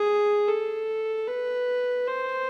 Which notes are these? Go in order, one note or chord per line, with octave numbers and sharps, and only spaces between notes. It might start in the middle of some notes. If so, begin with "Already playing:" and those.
Already playing: G#4
A4
B4
C5